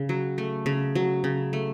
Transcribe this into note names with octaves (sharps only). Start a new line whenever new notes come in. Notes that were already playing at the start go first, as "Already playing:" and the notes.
Already playing: C#3
F#3
A3
C#3
F#3
C#3
A3